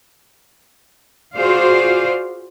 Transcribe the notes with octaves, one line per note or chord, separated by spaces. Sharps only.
F4 F#4 G#4 C5 D5 F5